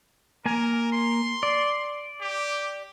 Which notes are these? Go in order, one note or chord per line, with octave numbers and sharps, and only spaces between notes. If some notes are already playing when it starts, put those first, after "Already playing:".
A#3 A#4 G#5
C6
D5
G4